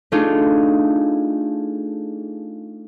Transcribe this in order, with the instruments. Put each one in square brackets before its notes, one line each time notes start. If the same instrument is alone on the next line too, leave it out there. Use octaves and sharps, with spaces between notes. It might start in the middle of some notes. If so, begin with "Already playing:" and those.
[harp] A3 D4 D#4 F4 G#4